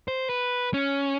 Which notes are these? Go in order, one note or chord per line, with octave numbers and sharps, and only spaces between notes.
C5
B4
C#4